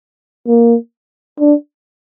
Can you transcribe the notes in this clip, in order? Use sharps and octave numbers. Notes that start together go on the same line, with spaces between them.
A#3
D4